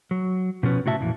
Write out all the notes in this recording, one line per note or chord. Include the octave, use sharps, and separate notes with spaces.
F#3
B2 F3 C#4 B4
A2 C3 F#4 E5 A5
F2 A#2 E3